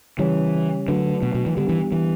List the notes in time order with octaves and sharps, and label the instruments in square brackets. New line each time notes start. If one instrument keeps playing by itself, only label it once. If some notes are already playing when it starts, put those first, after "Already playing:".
[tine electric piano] C#3 G3 C#4 G4 C#5 [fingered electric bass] E3
[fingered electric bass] D3 [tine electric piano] F#3 A3 D4 F#4 B4
[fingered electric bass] B2
B2
E3
[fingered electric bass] D3 [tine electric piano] G3 B3 D4 G4
[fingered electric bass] E3
E3